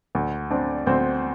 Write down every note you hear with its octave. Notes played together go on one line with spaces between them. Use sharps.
D2
C4 D4 D5
D2 C4 C5